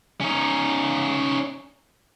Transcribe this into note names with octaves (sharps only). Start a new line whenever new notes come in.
C#4 D#4